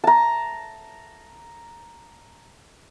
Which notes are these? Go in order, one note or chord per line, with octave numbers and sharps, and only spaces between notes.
A5 A#5